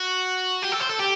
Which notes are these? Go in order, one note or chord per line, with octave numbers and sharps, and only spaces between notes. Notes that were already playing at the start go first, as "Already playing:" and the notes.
Already playing: F#4
G4
A4
C5
A4
G4